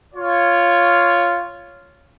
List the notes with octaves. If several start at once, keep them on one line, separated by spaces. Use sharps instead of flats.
F4 C#5